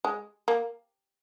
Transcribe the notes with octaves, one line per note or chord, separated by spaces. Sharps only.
G#3
A#3